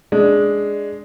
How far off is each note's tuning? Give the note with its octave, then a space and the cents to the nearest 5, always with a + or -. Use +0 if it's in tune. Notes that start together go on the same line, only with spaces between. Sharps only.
G#3 +0 D4 +0